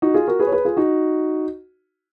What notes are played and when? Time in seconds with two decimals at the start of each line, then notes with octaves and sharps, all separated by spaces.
0.02 D#4 F#4
0.14 F4 G#4
0.27 F#4 A#4
0.40 G#4 B4
0.47 C#5
0.52 G#4 B4
0.65 F4 G#4
0.77 D#4 F#4